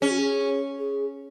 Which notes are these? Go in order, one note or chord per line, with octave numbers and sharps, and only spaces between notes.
C#4 G#4
F#4
G#4
G#4